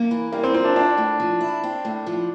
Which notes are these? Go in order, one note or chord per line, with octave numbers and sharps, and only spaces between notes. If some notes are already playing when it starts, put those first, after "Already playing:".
Already playing: A#3
E3
G3 A#3
C4
C4 F4
D4
C4 D4
A2
F3
E4
C4
A2
F3